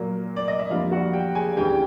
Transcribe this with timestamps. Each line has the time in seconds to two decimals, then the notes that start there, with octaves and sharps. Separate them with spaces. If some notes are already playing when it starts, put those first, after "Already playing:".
Already playing: A#2 F#3 A#3
0.36 D5
0.48 D#5
0.59 E5
0.70 F2 D3 G3 A#3 F4 F5
0.91 F#4 F#5
1.13 G4 G5
1.35 G#4 G#5
1.57 D2 C#3 E3 G4 G5
1.70 G5